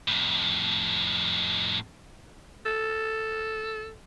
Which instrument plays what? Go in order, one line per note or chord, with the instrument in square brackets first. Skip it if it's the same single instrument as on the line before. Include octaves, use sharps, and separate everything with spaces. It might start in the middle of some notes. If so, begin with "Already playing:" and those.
[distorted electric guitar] F2 A2
[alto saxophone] A4